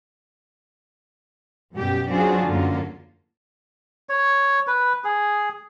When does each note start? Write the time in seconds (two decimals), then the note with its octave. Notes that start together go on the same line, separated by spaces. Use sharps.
1.75 F#2 B2 G3 G4
2.10 F#3 C4 D4 F4 F#4 G#4
2.46 F#2 D3 F#3 A#3 F4
4.09 C#5
4.67 B4
5.04 G#4